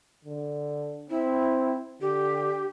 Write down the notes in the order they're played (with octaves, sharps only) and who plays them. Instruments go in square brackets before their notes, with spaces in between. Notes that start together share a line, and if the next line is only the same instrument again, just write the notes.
[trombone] D3
[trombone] C4 [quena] E4
[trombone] D3 [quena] G4